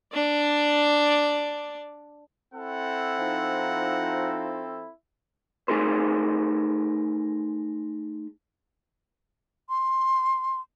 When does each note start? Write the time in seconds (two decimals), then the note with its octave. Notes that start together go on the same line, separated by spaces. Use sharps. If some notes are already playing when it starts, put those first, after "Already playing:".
0.13 D4 D5
2.54 C4 E4 A4 F#5
3.18 F3 D#4
5.68 A3 D#4 G#4 A#4 C5
9.69 C6